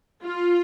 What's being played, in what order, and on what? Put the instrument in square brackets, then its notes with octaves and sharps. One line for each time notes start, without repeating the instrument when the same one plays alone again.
[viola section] F4